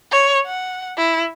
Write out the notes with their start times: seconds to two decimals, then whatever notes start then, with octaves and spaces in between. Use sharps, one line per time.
0.12 C#5
0.46 F#5
0.98 E4